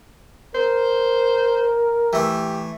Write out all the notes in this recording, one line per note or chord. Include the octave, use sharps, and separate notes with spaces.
A#4 C5
E3 A3 G4